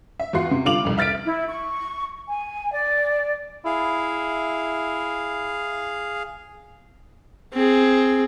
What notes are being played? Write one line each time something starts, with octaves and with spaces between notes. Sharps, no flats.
E5
E2 F4 F#4 C6 C7
C3
D3 G3 F4 D6 F7 F#7
C2 F2
E5 F6 A6 B6 D7
E4
C#6
G#5
D5
E4 G#4 F5
C4 G#4